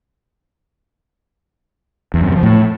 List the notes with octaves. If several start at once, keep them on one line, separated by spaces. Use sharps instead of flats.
E2
F#2
C3
F3
A2